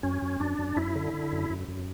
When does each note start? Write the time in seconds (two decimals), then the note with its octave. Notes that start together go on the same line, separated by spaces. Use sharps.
0.03 F#2 C#4
0.22 F#2
0.40 F#2 D4
0.59 F#2
0.76 F#2 E4
0.96 D3
1.14 D3
1.32 F#2
1.50 F#2
1.68 F#2